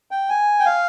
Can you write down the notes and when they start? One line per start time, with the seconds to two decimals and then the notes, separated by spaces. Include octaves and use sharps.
0.11 G5
0.30 G#5
0.59 G5
0.65 F5